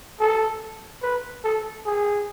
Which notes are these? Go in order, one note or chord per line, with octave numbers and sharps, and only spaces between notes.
A4
B4
A4
G#4